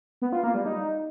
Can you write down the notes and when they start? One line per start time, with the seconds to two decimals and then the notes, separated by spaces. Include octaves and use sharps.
0.22 B3
0.33 F4
0.44 A#3
0.55 G3
0.66 D#4